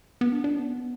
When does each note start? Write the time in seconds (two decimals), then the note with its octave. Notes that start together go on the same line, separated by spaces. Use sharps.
0.21 B3
0.32 D4
0.44 D4
0.57 B3